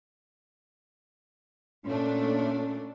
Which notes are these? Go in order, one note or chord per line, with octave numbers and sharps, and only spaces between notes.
A#2 A3 C#4 D4